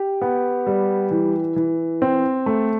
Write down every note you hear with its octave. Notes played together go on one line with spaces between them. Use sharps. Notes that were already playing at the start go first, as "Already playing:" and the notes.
Already playing: G4
B3
G3
E3
E3
C4
A3